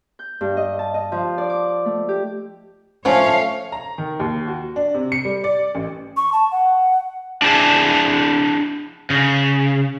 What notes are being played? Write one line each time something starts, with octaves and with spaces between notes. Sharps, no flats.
G6
G2
D#5
A5
D#5
F3
D5
D6
A3
G4
F3 A3 C#4 C#5 F5
A#5
D#3
D#2
F#4
D4
C3
C#7
G3
D5
A1
C#6
A5
F#5
D4 E4 G#4 A5
C#3